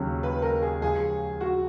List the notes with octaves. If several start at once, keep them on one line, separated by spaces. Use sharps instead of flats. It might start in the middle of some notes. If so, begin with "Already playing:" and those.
Already playing: D#2 C#3 F#3 C#4
B4
A#4
G#4
C#2 C#3 F3 G#4
F#4